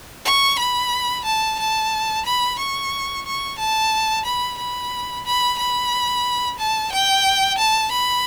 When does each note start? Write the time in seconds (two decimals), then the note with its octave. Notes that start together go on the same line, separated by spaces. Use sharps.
0.25 C#6
0.59 B5
1.25 A5
1.59 A5
2.25 B5
2.59 C#6
3.26 C#6
3.58 A5
4.25 B5
4.58 B5
5.25 B5
5.58 B5
6.59 A5
6.92 G5
7.58 A5
7.92 B5